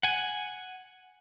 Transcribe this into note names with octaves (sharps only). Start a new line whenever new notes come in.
F#5 G#5